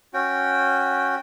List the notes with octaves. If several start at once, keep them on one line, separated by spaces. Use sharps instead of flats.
C#4 F#4 G5